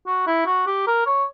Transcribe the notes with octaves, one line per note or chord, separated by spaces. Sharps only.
F#4
E4
F#4
G4
A#4
C#5